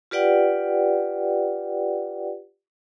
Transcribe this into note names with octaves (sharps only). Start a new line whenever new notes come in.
F4 G4 B4 D5 F#5 G5